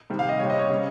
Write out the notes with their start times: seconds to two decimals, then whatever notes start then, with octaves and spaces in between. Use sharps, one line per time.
0.10 C3 D#3 G3
0.19 F5
0.29 D#5
0.39 C3 G3 C#5
0.50 D#5
0.59 C#5
0.69 C#3 G3